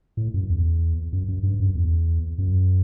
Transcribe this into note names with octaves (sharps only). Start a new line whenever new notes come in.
A2
F#2
E2
F#2
F#2
G2
F#2
E2
F#2